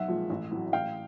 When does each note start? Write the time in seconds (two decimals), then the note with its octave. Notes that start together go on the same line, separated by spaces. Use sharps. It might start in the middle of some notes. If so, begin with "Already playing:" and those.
Already playing: B1 E5 F#5
0.08 A#2 F3 G#3
0.30 A1
0.52 A2 F#3
0.73 A1 F5 G5